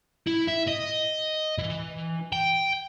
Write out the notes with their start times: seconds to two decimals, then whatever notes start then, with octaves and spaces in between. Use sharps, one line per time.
0.27 E4
0.47 E5
0.67 D#5
1.58 E3
2.32 G5